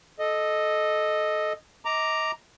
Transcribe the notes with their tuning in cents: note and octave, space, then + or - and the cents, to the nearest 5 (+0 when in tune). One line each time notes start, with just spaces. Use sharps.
A4 -15 D#5 -5
D#5 +30 A#5 +0 D6 +0